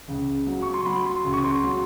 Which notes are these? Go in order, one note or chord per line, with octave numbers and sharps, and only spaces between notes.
C#2
F#3
C#6
C6
F#3 B5
C6
C#2
C#6
C6
F#3